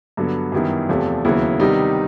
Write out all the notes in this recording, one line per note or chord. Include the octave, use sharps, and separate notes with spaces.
G2 D3 F#3 B3
F#2 D#3 G3 B3 E4
E2 C3 F3 A3
D#2 C#3 F#3 B3 E4
C3 D#3 G3 B3 D#4